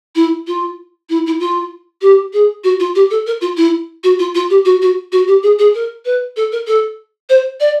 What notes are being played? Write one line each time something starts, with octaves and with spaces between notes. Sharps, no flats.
E4
F4
E4
E4
F4
G4
G#4
F#4
F4
G4
A4
A#4
F4
E4
F#4
F4
F4
G4
F#4
F#4
F#4
G4
G#4
G#4
A#4
B4
A4
A#4
A4
C5
D5